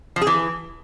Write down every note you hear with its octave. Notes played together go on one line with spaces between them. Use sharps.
F3
G#4
E3